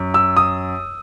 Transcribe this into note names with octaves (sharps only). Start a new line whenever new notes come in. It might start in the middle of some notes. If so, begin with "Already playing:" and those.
Already playing: F#2
E6
D#6